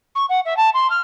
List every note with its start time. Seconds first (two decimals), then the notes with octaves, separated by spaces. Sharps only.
0.15 C#6
0.29 F#5
0.45 E5
0.57 A5
0.74 C6
0.90 F6